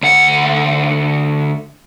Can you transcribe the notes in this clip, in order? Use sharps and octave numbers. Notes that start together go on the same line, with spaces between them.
D2 F#5